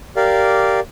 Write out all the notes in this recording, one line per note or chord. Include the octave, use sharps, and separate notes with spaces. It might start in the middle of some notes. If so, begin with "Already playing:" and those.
G4 A#4 D5 F5